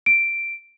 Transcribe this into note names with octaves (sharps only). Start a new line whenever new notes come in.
D7